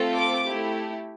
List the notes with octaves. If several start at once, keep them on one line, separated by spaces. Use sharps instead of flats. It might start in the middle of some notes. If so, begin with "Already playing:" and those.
Already playing: A3 C4 F4 A4
D6
A3 E4 G4